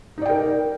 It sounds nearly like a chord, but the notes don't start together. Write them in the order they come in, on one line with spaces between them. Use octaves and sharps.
D#4 D5 G5 A#4